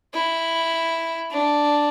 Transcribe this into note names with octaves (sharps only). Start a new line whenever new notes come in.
E4
D4